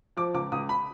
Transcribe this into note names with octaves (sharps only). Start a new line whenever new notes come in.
F3 D6
C#2 D6
C#2 D#6
B5